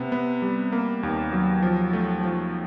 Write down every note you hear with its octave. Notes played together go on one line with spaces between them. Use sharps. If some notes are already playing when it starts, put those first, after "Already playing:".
Already playing: C3 B3
B3
G3
A#3
D#2
F#3
F3
A3
F3